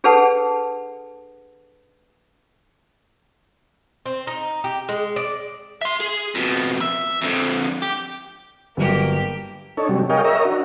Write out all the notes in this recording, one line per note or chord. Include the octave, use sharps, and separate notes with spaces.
D4 G#4 A4 B4 F#5 A5
C4
D#4
G4
G#3
D5
E5 C6
G#4
F2 B2
E5
F2 D3
G4
G1 F#3 A#3 G4
D4 D#4 A4 C#5
C3 F#3 G3
G#4 A#4 C#5 D#5 F5 G5
A#4 C#5 D#5 E5 A#5
D4 F#4